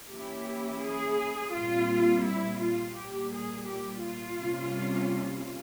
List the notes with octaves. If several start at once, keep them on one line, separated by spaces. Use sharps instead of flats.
E3 A#3 C#4 E4 G4
G#4
A#2 G3 C4 F4
E4
F4
A#2 G3 A#3 G4
G#4
G4
F4
C3 G3 A#3 C#4